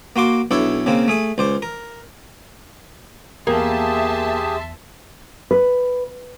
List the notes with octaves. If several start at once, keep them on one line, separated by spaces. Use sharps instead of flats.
A#3 F#4 C6 D6
B1 D4 E4 A4 C#5
C#3 A#3 C4
A3 G#4 D#6
C#2 C5 D5
A#4
E2 A#3 G4 G#4 E5 A5 C6 D#6
B4